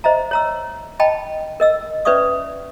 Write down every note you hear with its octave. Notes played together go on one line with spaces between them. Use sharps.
C5 D#5 E5 A#5
C#5 A#5 E6
D#5 G5 A5 B5
A#4 D#5 E6
C#4 B4 D5 E5 C#6 D#6